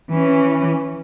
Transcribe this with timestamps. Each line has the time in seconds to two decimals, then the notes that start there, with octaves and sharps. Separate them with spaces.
0.11 E3 C#4